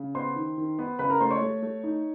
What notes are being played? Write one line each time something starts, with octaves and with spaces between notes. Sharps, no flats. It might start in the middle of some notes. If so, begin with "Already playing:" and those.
Already playing: C#3
B3 C5 C6
D#3
D#3
B3
C#3 B4 B5
A#4 A#5
A3 C5 C6
C#5 C#6
A3
A3
D#4